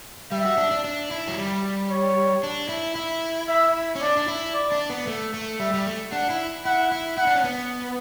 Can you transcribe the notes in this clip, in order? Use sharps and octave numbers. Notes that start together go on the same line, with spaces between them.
G3 E5
F#4
D4
D4
D4
E4
F#3
G3
C#5
D4
E4
E4
E5
C#4
D4 D5
D4
E4
D5
D4
B3
A3
A3
G3 E5
G3
A3
D4 F#5
E4
E4 F#5
E4
E4 F#5
D4
C#4
B3